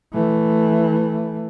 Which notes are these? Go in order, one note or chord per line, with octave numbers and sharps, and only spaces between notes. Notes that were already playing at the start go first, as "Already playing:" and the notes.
E3 A3